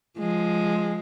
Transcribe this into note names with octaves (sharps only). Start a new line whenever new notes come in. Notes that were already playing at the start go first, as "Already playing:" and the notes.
F3 G#3